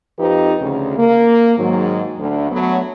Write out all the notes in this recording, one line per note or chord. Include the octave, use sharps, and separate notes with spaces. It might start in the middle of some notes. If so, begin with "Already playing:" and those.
F2 F3 C4 D#4 G4 B4
D2 C#3
A#3
G#2 D#3 F#3
D2
F#3 A3 B3